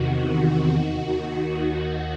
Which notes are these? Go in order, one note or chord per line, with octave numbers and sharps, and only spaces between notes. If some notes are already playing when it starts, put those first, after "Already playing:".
Already playing: E2 C3 D#3 F#4
D#2 D#3 F#4